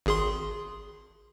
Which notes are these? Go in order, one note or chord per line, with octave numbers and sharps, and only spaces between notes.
G#1 G#4 C6